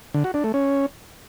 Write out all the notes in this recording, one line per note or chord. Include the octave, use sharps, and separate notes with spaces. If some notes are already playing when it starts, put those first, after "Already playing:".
D3
F#4
D4
A3
C#4